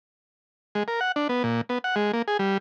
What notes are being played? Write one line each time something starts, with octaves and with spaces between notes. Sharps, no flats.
G#3
A#4
F#5
D4
B3
A#2
B3
F#5
G#3
A#3
G#4
G3